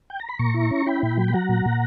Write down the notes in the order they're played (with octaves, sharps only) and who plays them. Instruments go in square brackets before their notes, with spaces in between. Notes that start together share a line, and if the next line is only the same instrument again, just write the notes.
[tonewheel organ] G5
A#5
B5
A#2 A#5 C#6
E4
C#4
E4 G5 B5
A#2
F#3
B5
F#3 F#5 A#5
A#2
A#2